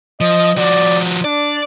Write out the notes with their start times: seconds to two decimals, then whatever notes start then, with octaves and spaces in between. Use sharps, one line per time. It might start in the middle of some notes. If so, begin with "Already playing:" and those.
0.21 F3 D#5
0.58 F3 F#4 D5
1.24 D4 D5